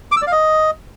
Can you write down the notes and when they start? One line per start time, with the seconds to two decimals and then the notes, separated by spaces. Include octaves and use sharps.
0.12 D6
0.17 E6
0.22 D5
0.27 F5
0.32 D#5